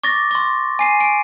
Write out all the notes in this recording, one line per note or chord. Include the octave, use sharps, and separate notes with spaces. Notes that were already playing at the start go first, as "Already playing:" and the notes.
C#6 D6 A6 A#6
C6 C#6
G#5 C7 D#7
D7